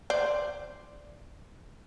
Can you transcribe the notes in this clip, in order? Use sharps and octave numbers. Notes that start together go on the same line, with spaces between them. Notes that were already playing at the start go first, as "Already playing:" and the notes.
C5 D5